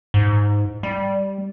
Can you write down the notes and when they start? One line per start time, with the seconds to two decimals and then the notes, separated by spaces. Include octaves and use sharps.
0.14 G#2
0.83 G3